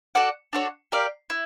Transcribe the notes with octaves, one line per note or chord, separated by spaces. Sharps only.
F#4 A4 D5 F#5
D4 F#4 A4 C#5
G4 A#4 D5 F5
E4